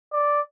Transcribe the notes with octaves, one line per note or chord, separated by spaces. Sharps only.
D5